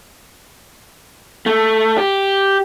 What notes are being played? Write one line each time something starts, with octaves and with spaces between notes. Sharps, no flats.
A3
G4